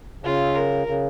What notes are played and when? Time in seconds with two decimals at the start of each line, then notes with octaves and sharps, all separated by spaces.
0.24 C#3 F4
0.56 A#4
0.87 C#3